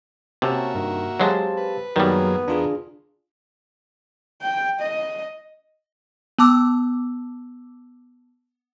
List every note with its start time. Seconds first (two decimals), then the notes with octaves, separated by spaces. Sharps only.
0.42 C3 A#3 C#4 F#4 E5 A5
0.75 G2 D#3
1.20 F#3 G#3 C4 G4 F5 A5
1.57 B4
1.96 F#2 D#3 F#3 G3 A#3 B3 G#4
2.48 E2 D4 F4 G#4 A#4
4.42 G5
4.80 D#5
6.38 B3 A5 D6 E6